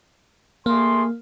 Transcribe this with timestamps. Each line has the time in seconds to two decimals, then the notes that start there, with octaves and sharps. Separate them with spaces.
0.66 A3 A#3 G#4 C6